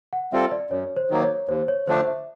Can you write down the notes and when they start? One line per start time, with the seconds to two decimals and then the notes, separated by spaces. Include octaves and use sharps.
0.13 F#5
0.32 G3 C4 F4 A4 E5
0.51 D5
0.70 F#2 C#5
0.96 C5
1.10 D#3 F#3 A#3
1.22 C#5
1.49 D#2 C5
1.68 C#5
1.87 D3 F3 A3 D4 C5
2.07 E5